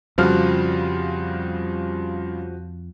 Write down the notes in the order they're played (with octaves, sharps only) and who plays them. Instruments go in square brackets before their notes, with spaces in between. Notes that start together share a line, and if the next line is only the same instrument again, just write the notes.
[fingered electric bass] F2 [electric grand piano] C#3 G3 F4 [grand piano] F3 F#4 F6